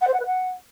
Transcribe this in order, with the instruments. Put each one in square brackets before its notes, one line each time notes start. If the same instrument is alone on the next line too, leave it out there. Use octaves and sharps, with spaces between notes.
[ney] F#5
C5
F#5
B4
F#5